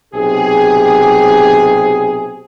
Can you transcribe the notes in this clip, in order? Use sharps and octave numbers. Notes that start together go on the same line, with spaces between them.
B1 C3 G4 G#4